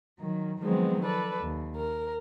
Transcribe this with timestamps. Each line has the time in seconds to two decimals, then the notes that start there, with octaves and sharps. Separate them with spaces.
0.19 D#3 F#3
0.61 D#3 F3 F#3 G#3 B3 C4
1.04 A4 B4 D5
1.40 D#2
1.76 A#4